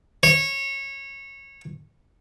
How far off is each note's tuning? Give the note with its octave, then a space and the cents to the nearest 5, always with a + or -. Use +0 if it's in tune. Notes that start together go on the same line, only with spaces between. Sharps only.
C#5 -20